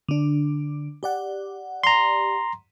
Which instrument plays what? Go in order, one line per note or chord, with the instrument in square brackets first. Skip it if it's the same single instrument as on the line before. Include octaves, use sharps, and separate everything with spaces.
[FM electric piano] D3 D4
G4 D5 F#5
[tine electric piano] A#5 C6